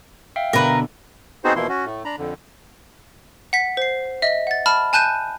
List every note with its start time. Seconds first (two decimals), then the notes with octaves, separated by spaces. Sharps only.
0.36 E5 F5 G5
0.53 B2 D3 B3 A#4 B4
1.44 B3 C4 D#4 F#4 G#4 C5
1.56 B2 E3 F3 A#3 E4 C6
1.69 C#4 F#4
1.86 A2 A3
2.05 D4 A#5 B5
2.18 F2 D3
3.53 F#5 B6
3.77 C5 C7
4.22 D#5 E5
4.47 F#5 A6
4.66 A5 B5 F6
4.93 G#5 A5 F#6 G6 D#7